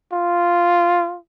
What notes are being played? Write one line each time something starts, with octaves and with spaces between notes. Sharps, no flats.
F4